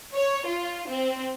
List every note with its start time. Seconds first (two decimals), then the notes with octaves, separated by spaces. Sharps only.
0.15 C#5
0.46 F4
0.88 C4